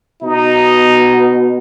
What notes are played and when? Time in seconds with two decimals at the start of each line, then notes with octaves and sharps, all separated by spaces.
0.23 B2 D#4